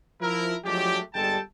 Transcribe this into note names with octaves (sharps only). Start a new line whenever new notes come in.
F3 E4 A#4
F3 F#3 G#3 A3 D4 G4
G1 G3 G#3 A4 G5 A5